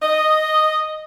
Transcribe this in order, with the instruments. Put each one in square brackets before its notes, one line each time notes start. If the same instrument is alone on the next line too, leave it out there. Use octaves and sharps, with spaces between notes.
[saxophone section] D#5